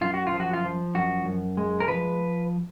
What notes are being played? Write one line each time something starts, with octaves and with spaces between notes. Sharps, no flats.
F#2 F4
F#4
F4
F3
F#4
F4
F3
F#2 F#4
F#2
G#3
A#4
F3 B4